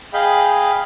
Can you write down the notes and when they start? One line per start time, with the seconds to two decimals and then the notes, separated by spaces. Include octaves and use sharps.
0.13 G#4 D#5 F5 G5 B5